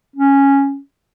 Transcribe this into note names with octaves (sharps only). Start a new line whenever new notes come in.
C#4